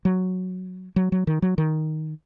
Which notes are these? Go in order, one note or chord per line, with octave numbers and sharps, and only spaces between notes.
F#3
F#3
F#3
D#3
F#3
D#3